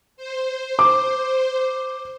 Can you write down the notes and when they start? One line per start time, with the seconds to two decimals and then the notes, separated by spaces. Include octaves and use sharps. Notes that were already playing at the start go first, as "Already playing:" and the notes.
0.17 C5
0.79 D6